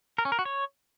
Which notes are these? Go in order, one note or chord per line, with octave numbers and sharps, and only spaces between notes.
A#4
C#4
A#4
F#4
C#5